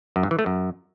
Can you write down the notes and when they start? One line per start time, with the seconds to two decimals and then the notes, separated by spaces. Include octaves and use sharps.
0.16 F#2
0.23 G2
0.31 E3
0.39 A3
0.46 F#2